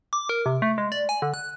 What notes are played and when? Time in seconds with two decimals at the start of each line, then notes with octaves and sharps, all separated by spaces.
0.13 D6
0.29 A#4
0.46 C3
0.62 A3
0.78 G#3
0.92 D5
1.09 G#5
1.22 D3
1.34 F#6